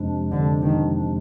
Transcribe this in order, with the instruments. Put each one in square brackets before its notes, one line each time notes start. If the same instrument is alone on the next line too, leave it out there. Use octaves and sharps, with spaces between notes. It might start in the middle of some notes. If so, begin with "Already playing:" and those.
Already playing: [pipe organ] F2 C3 F3 G#3 D4
[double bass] D3
D#3